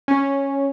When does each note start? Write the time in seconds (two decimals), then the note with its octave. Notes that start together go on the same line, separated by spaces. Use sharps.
0.08 C#4